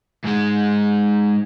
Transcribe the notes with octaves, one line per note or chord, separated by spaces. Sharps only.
G#2 G#3